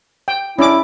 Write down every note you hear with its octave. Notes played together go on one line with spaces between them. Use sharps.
G5
C#4 D4 E4 D6